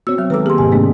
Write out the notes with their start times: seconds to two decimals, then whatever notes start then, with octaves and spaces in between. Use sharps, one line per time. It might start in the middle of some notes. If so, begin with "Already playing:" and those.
0.07 B3 C4 F#4 C#5 E6
0.18 F#3 F6
0.30 D#3 G#3 A4 B4 A#5 D6 E6
0.46 A#3 G4 G#4 C6
0.58 F2 G#2 C3 G#5
0.72 D#3 A3 B3 C#4 D4 G#4